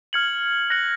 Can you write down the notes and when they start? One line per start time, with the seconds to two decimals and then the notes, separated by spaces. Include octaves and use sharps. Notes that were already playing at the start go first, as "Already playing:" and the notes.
0.13 F6 G#6 C#7 F#7
0.70 F#6 A#6 C#7 F#7